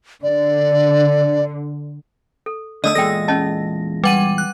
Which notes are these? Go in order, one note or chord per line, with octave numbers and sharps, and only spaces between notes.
D3 D5
A4
D3 A3 D4 D5 D#5 D#6 E6
E2 A#2 G#3 A4 G5 A#6
C#4 D#5 A5
G3 B4 F#5 G#5 D#7
F#6